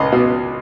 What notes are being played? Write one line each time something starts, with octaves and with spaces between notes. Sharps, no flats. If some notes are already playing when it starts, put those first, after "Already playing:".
Already playing: C#2 B4 D#5
B2